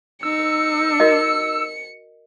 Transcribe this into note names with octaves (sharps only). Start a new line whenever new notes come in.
D#4 E6 C#7
F#4 A#4 D#5